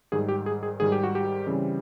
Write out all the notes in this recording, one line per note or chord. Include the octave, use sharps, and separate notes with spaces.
G#2 D#3 G3 G#4
G4
G#4
G#4
G#2 D#3 G3 G#4
G4
F#4
G4
C#3 E3 G3 C4